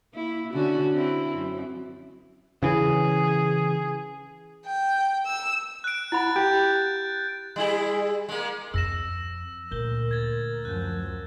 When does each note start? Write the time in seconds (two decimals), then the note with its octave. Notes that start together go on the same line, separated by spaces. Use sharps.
0.14 A#3 E4
0.53 D3 C#4 F#4
0.92 C4 E4
1.35 F#2
2.63 C#3 E3 G#4
4.66 G5
5.26 E6
5.84 F#6 D7
6.12 E4 F#5 B5 A6
6.36 G4 G6
7.56 G3 E4 G#4
8.29 G#3 A#3
8.74 F2 E6 A#6 E7
9.71 D2 A#2 A#4 G6 G7
10.11 G#6 A6
10.65 F#2 F3 F#6 G6